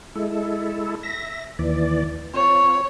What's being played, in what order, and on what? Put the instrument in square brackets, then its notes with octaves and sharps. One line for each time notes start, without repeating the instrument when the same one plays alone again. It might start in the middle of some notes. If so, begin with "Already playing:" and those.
[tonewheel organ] G#3 E4 A4
E5 A#6
D#2 E3 D5
[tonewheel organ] C4 F4 [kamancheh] C#5